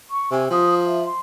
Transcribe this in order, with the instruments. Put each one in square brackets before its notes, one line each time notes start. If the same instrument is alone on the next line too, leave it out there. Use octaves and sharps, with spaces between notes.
[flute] C#6
[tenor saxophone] C3 [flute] G#5
[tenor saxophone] F3 [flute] D#6
[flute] E5
C6